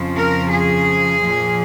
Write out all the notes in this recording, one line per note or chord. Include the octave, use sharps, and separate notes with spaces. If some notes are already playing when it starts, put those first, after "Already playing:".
Already playing: F2 C#3 F3
A#4
G#4
A#2 F3